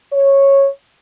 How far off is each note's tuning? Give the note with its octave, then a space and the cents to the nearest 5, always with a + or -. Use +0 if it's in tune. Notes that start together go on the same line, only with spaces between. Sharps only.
C#5 -10